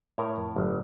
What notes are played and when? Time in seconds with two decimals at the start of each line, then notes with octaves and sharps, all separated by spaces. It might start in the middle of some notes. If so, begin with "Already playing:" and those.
0.18 A2 A#4 C#5
0.38 F2
0.56 G1 A2 F#3